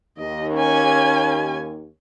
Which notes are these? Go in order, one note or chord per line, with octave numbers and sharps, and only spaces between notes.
D#2 D#5
C#4 G#5